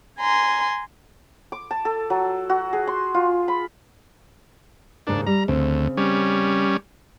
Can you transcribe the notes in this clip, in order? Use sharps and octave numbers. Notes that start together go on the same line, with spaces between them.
G#5 A#5 C6
D6
A5
A4
F#3
F#4
G#4
C6
F4
B5
D#2 G#2 C#3 D4
G3 A#5
D2 C#3 C4
G3 C#4